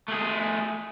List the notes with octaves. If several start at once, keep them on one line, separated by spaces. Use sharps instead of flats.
A3 G#4